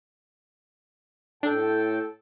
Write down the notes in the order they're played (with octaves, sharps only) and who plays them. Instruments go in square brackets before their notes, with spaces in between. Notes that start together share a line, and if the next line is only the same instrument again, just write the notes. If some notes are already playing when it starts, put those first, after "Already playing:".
[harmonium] A2 G5 A5 [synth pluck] D4 [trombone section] A4